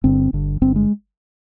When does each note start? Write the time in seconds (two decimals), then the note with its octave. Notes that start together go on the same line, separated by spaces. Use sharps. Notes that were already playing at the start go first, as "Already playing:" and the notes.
0.04 G1 G2 D3 C4
0.33 G1 G2 D3
0.61 G1 G2 D3 C4
0.76 G#3